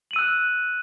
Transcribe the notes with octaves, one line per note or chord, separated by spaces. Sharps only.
E6 F#6 D#7 F#7